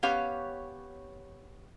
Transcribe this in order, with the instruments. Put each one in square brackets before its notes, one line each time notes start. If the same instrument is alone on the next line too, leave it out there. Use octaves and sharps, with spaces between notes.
[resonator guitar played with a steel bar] B3 C#4 G4 C#5 F5